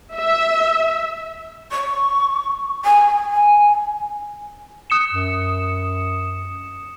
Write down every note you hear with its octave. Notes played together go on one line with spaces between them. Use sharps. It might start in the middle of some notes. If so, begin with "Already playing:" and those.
E5
C#6
G#5
G#5
D#6 C#7 E7
F#2